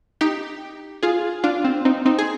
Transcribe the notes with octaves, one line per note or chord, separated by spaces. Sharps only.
D#4 G4
F4 G#4
D4 F4
C4
C4 D#4
C4 D#4
G#4